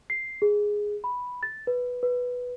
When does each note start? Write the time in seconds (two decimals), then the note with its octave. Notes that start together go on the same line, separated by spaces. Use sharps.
0.10 C7
0.42 G#4
1.04 B5
1.43 A6
1.67 B4
2.03 B4